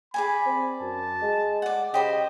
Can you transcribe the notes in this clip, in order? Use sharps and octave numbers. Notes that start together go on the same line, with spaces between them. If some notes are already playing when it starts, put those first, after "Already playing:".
G#4 D5 G#5 B5
C4
F#2 A5
G#3
D5 F#5
C#3 G4 C5 D#5 B5